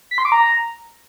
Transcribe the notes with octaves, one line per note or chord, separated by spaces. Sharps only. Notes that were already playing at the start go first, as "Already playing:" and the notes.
B6
C6
D6
A#5